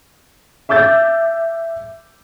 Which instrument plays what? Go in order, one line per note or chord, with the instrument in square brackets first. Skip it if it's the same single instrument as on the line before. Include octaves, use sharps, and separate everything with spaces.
[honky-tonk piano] E5 D6 E6 G6 A6